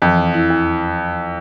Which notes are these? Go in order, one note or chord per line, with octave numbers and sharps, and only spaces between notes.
F2 E3
E2
E4
E2